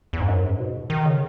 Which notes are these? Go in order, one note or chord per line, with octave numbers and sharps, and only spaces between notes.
E2
G#2
F#2
G#2
B2
D#3
C#3